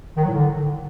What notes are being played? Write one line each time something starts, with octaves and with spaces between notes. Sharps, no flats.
D#3
F#3
A2
D3